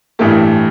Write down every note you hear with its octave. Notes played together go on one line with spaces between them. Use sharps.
A1 G2 E3 A3 G4